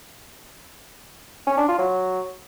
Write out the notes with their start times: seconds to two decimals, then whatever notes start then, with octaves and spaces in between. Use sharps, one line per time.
1.47 C#4
1.58 D4
1.68 F4
1.79 F#3